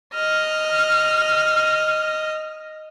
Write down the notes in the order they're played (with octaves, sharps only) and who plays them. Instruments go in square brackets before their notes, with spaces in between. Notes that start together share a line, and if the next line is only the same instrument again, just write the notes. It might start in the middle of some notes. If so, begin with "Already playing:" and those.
[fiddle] D#5 [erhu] F6